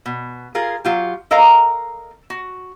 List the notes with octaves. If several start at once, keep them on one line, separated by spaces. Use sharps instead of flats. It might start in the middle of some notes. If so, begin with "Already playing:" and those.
B2
F4 G#4 A#4
F#3 F4 G4
A4 A#4 D#5 F5 A#5
F#4